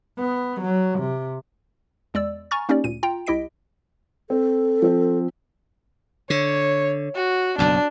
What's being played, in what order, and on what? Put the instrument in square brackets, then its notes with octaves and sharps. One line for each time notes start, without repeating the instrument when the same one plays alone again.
[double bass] B3
F#3
C3
[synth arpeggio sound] E2 G#3 D5 E6
G#5 A#5 C#6 F6 A6
A#3 C#4 D#4 G4 D5
D2 A#2 D#7
F4 G5 A#5
C2 E4 G4 D#5 B6 D7
[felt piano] C4 [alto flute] A4
[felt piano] F3 C4
[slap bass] D3 [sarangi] C#5
[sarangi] F#4
[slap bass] F#1 B1 F#2 [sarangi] D4